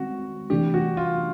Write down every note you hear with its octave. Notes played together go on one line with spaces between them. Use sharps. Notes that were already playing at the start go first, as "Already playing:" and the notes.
Already playing: D#3 G#3 C4 F#4
C3 E3 A3 D4 G4
F#4
F4